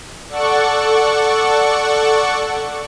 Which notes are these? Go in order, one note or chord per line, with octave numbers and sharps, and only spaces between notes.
A4 D5 F#5 C#6